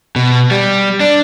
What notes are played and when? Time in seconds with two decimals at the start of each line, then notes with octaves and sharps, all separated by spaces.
0.16 B2
0.51 G3
1.00 D4